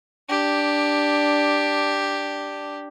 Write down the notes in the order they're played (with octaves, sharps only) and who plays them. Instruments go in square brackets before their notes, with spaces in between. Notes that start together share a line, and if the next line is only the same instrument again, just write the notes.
[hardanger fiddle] D4 G4